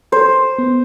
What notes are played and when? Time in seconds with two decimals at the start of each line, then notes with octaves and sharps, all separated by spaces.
0.12 A4 C5
0.58 B3